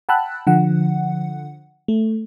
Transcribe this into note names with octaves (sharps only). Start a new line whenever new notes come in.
F#5 G5 A5 B5 E6 F#6
D3 F3 F#5
A3